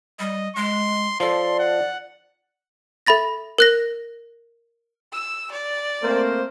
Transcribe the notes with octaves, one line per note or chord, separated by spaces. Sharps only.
G3 D#5
G#3 C6
F3 A4 D5 C6
F#5
A4 E5 B5 A6 A#6
A#4 F#6 A#6
E6
D5
A3 A#3 C4 A#4 C5